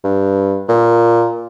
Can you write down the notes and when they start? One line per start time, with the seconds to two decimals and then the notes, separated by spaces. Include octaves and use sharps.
0.04 G2
0.69 A#2